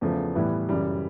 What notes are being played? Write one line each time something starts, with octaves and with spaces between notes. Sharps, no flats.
E2 C#3 F3 A3
A2 E3 G3 B3 E4
F#2 C#3 E3 G3